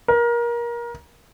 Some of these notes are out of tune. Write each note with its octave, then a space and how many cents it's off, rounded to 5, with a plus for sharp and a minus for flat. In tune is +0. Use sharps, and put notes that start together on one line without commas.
A#4 +25